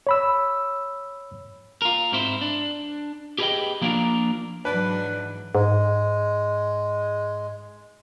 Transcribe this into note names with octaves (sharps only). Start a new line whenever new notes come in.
C#5 B5 E6
F4 A#4
G#2 C4 E4 C5
D4
G4 G#4 B4 C#5 D#5 G5
F3 A#3 D4 F4 A#4
G#2 E3 F#3 D4 B4
G#2 G#3